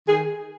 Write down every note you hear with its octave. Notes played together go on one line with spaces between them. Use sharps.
D#3 G#4